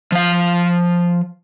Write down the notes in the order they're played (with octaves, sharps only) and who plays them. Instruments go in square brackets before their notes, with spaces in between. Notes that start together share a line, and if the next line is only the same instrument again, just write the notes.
[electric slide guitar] F3 F5